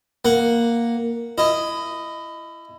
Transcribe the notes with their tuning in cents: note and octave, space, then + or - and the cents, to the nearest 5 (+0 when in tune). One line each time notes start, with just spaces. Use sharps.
A#3 +0 F#5 +0
E4 +20 D#5 +0